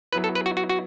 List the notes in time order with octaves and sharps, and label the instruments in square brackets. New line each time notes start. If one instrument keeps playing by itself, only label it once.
[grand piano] F#3 B3 E4 [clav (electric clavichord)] B4
[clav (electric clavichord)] A4
B4
F#4
F#4
F#4